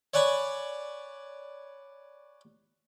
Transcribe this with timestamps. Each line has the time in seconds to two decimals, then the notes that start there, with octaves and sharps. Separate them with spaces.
0.14 C#5 D5 F#5 G#5 B5 C#6